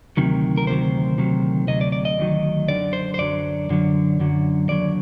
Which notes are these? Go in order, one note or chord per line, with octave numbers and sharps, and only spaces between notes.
D2 C3 D#3 F#3
A#4
D2 C3 D#3 F#3 C5
D2 C3 D#3 F#3
D2 C3 F#3 D#5
D5
D5
D#5
D2 C3 D#3 F#3
F#2 D3 F#3 D5
C5
C5
F#2 D3 F#3 D5
F#2 D3 F#3
F#2 D3 F#3
D#2 D3 F#3 D5